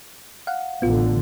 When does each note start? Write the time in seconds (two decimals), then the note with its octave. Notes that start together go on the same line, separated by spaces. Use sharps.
0.47 F5 F#5
0.82 A1 D3 B3 F4